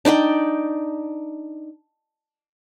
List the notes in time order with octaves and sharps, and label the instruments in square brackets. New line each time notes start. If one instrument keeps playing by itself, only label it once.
[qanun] D4 D#4 D5 G5